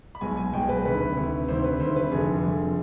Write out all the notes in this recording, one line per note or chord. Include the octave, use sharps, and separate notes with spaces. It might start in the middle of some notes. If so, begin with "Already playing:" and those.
B5
B1 B2 G#3 G#5
G#5
B1 B2 G#3 G5
G#4
B4
D2 C3 D#3 B4
B4
D2 C3 D#3
D2 C3 D#3 C5
B4
D2 C3 D#3 C5
B4
F1 F2 D3 G#4
F1 F2 D3